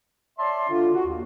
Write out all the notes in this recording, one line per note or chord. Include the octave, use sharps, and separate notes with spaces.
C#5 D5 E5 A5 C6
D3 D4 F4
F#4
D#2